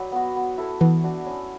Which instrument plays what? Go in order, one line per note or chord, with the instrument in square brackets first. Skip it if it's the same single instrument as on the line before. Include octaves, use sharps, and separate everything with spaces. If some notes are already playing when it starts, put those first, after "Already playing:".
Already playing: [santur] F#3 B4 D5
B3 F#4
B3
E4 A4
[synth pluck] E3 [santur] B3
[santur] D4 F#4
C#4